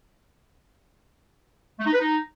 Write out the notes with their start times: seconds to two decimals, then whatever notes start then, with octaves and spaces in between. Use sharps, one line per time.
1.79 A3
1.86 D#4
1.93 B4
2.00 D#4